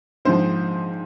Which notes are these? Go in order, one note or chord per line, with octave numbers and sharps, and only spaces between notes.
A#1 G#2 F3 C5